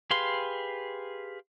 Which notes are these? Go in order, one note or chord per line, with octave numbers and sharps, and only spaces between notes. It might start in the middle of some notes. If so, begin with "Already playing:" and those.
G4 G#4 B4 F5 C6